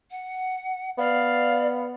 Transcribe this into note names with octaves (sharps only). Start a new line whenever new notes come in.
F#5
B3 D5 F5